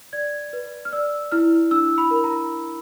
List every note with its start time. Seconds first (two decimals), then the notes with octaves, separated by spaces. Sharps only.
0.13 D5 G#6
0.53 B4
0.85 F6
0.93 D5 E6
1.32 E4 F6
1.71 D4 E6
1.98 B5
2.11 A#4
2.24 A#5